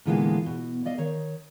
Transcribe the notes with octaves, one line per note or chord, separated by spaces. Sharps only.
A#2 D3 E3 G#3 B3 F4
B2
D5 D#5 F5
D#3 C#5